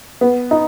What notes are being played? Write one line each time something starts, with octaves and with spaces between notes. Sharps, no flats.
B3
D#4